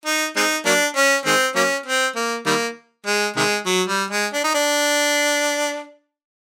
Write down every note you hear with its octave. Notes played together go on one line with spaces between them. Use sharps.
D#4
G#3 C4 D#4
F#3 A#3 D4
C#4
D#3 G#3 C4
F#3 A#3 C#4
C4
A#3
D#3 G3 A#3
G#3
C3 D#3 G#3
F#3
G3
G#3
D4
D#4
D4